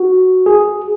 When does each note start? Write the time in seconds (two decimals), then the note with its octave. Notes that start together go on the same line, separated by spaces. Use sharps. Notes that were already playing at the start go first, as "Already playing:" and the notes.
Already playing: F#4
0.46 G#4